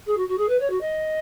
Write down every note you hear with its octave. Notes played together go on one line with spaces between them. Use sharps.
G#4
F#4
F#4
G#4
B4
C#5
F#4
D#5